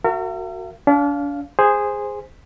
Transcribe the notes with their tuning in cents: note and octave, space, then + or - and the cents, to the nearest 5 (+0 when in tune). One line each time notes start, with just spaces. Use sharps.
F#4 +0 A#4 -40 E5 +45
D4 -40 F5 +0
G#4 -10 C5 +0